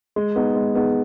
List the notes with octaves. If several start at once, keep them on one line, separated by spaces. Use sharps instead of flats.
G#3
B3 D#4 G#4
G#3
B3 D#4 G#4